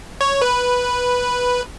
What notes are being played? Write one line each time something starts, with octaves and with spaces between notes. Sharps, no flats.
C#5
B4